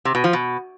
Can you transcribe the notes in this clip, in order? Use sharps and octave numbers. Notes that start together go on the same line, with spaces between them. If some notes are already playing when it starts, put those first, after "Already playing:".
C3
B2
F3
B2